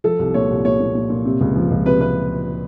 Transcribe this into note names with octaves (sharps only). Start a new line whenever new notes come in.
F3 A4
C2
A#2 C#5
C2
A#2 C#5
A#2
A#2
A#2
C3
C#2
F3
C#2
C3 B4
C3 B4